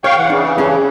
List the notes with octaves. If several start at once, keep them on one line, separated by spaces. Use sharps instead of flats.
C#5 F5 G5 C#6
E3 F#5
C#3 E3 D4
C#4 G#4 A4